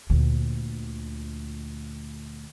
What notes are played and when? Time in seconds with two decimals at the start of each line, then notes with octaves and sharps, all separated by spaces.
0.10 D2 A#2